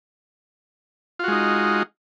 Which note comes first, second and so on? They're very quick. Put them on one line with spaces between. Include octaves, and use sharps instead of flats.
F4 F#4 G#3 D#4